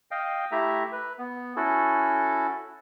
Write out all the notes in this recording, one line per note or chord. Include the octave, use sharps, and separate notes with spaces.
D#5 F5 G5
A3 E4 G4 E5 A#5
B4
B3
C#4 E4 F#4 A4